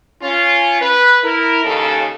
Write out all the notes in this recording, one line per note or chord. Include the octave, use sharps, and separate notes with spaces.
C#4 F4
B4
E4 A#4
D#2 C#3 A4